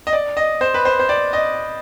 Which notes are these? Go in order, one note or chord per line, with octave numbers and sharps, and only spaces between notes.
D#5
D5
D#5
C5
B4
C5
C5
D5
D#5